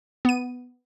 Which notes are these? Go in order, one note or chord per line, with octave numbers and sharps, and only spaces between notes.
B3 D#7